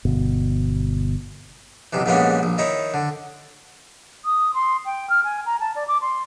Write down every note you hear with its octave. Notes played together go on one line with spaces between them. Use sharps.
G1 B2
B1 C3 E3
A#1 G#2 G3 A#3 B3 C#4
A#1
D#3 D#4 E4 C#5
D3
D#6
C6
G5
F6
G#5
A#5
A5
D5
D6
C6